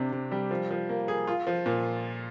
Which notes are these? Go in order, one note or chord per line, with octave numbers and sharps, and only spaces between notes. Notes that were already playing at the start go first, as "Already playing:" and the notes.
Already playing: C3 D4
C3
G3
F3
F3
A#3
G#4
F4
F3
A#2